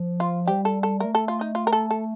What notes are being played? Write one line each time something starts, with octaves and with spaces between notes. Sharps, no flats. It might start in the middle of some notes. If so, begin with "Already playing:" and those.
Already playing: F3
F4
G3 G4
A4
A4
A3 A#4
A4
F4
D#4
F4
A#4
A4
A4